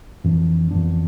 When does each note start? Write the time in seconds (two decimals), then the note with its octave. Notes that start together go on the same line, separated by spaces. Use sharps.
0.24 F2 E3 B3 D4
0.71 F2 E3 B3 D4